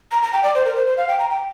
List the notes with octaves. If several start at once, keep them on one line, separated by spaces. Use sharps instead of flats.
A#5
A#5
G5
D5
C5
A#4
C5
C5
F5
G5
A#5
G5